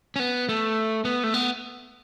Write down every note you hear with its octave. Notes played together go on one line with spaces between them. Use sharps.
C#4
B3
A3
B3
A3
B3